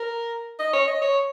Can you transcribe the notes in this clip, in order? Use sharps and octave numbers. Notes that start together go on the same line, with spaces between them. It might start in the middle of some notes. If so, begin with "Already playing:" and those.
Already playing: A#4
D#5
C#5
D#5
C#5